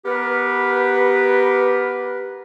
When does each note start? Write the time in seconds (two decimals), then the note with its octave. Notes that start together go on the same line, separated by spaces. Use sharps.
0.06 B3 G4 A#4 B4